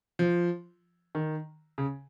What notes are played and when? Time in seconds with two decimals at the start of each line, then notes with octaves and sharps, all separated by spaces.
0.19 F3
1.15 D#3
1.78 C#3